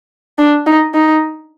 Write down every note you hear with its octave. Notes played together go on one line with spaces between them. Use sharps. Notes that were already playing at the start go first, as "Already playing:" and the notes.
D4
D#4
D#4